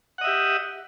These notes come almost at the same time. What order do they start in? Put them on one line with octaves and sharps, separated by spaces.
F#5 D#5 E5 G4